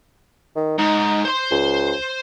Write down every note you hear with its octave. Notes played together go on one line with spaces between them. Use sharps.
D#3
G#2 D#4
C5 C6
C#2